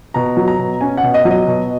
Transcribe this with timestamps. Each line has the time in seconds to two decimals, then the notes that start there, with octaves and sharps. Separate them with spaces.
0.14 B2 A#5
0.37 F#3
0.48 A#5
0.59 B2
0.81 C#4 G#5
0.97 F#5
1.03 B2
1.14 D#5
1.25 F#3
1.31 D#5
1.47 B2